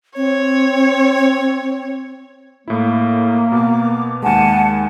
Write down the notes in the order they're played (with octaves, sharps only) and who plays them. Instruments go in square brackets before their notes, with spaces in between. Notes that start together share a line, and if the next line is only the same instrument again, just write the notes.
[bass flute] C4 [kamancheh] C#5
[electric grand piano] A2 E4 [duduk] A#3
[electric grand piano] B2 B3 [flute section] D6
[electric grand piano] D#2 G#3 [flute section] F#5 G#5 A5